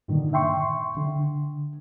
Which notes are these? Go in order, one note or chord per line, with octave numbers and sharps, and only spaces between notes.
G2 A#2 D3 D#3 D4
E5 G5 C6 C#6
D3